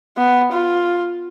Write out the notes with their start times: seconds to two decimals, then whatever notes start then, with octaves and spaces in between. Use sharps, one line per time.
0.17 B3
0.52 F4